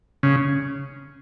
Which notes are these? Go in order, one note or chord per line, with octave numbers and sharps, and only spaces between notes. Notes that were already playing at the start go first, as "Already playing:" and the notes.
C#3